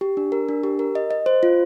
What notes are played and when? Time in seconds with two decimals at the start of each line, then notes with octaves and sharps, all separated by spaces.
0.01 G4
0.17 D4
0.32 A#4
0.49 D4
0.64 G4
0.79 A#4
0.95 D#5
1.11 D#5
1.26 C5
1.43 F4